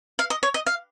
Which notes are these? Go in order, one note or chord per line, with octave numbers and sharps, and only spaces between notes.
F5
D#5
C#5
D#5
F5